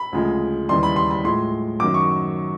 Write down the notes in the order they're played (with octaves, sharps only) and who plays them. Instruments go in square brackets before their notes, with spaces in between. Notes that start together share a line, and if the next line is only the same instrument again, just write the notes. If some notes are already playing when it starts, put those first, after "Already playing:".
Already playing: [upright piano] B5
D2 C#3 F3 G#3
D#2 C#3 E3 G3 C6
B5
C6
B5
A2 F3 G#3 C6
F#2 D#3 F#3 D6
C#6